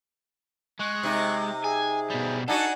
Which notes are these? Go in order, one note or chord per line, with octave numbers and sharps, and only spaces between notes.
G#3 C#6 F#6
C3 D#4
G#4 G#5
B2 G3
D4 D#4 F#4 A4 F#5 G#5